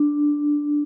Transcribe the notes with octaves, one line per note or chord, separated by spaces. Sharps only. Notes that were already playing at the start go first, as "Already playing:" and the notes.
Already playing: D4